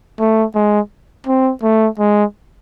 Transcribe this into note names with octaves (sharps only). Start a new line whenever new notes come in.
A3
G#3
C4
A3
G#3